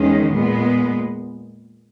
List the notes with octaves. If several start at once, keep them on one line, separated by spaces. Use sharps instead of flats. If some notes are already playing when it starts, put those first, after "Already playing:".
Already playing: E2 D#3 G#3 C#4
A#2 G#3 B3